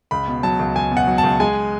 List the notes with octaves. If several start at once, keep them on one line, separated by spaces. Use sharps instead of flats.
C#2 B5
B2
F#3 A5
C#2
C#2 G#5
B2
F#5
F#3
A5
C#2
G#3 G#5